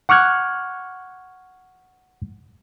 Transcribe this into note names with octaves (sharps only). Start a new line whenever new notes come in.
F#5 C#6 D6 F6 F#6 G#6